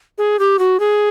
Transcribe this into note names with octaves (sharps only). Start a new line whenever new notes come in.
G#4
G4
F#4
G#4